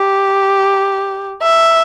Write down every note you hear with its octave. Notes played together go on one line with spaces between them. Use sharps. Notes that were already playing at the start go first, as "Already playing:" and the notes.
Already playing: G4
E5